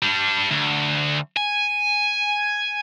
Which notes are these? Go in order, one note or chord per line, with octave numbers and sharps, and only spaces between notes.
G3 D4
D2
G#5